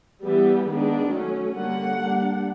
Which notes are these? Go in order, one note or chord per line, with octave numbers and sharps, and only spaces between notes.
E3 G3 B3
D#3 G#3 B3 D4
F#3 A3 C#4
D3 G3 A#3 C#4 F#5
G3 A#3 D4